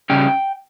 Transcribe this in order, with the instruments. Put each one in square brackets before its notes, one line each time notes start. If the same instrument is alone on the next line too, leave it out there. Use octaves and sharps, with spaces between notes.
[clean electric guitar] C#3 G3 C#4 G5